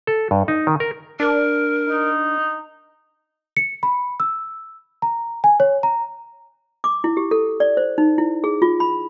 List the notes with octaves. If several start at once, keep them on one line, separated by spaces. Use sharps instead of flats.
A4
G2
D#4
D#3
A#4
D4 A#4
D#4
C#7
B5
E6
A#5
G#5
C#5
A#5
D6
E4
G4
A4
D5
C5
D#4
E4
G#4
F4
B5